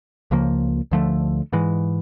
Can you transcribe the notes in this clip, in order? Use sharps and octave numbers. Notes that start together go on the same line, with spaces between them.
C#2 C#3 F3 A#3
D2 D3 F3 A3
G#2 E3 G#3